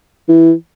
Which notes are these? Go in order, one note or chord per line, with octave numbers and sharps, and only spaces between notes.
E3